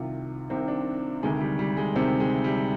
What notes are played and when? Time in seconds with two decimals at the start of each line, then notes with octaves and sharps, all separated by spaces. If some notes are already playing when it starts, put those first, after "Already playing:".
Already playing: C2 C3 D#3 F4
0.50 C2 C3 D#3 C4
0.68 D4
1.23 D2 C3 D#3 G#3
1.41 G3
1.59 G3
1.77 G#3
1.96 D2 C3 D#3 C4
2.20 G#3
2.44 G3